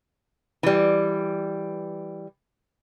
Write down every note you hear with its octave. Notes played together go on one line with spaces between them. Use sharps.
E3 G3